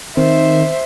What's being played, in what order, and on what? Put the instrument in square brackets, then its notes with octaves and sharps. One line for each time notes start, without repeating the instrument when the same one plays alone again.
[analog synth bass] D#3 [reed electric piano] C4 [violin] C5 [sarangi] E5